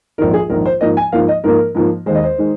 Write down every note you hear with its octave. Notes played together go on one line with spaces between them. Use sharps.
A#1 G#2 D#3 A#4
G#4
A#1 G#2 D#3 A#4
C5
G#2 F3 A#3 D#5
G#5
G#2 F3 A#3 F5
D#5
G#2 F3 A#3 A#4
G#2 F3 A#3
D#2 D#3 G#3 C5
D#5
C5
D#3 G#3